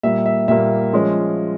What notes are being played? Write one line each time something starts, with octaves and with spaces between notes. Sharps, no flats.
A#2 G3 A#3 E5
E5
A#2 G3 A#3 E5
F3 G#3 C#4